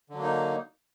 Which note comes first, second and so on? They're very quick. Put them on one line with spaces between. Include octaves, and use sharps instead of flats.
D3 F#3 A#3 D#4